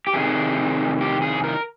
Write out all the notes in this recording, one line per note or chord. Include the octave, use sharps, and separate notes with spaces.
G4
F2 C3 D#3 G#4
G4
G#4
A#4